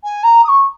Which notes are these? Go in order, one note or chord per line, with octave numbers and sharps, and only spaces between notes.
G#5
A#5
D#6
C#6